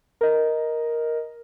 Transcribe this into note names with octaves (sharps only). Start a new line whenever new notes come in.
A#4 D#5